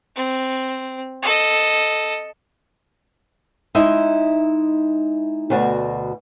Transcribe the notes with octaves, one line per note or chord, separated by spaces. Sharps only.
C4
A4 D#5
G#3 D#4 E4 D#5 E5
D2 B2 F#4 D5